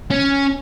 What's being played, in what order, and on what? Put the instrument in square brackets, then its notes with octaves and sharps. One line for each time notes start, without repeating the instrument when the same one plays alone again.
[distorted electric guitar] C#4